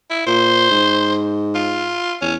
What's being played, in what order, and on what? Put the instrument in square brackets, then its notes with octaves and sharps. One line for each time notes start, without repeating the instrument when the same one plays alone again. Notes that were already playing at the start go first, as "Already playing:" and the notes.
[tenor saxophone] E4
[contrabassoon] A#2 [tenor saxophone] C5
[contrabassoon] G#2
[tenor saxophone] F4
[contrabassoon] E2 [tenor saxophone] C#4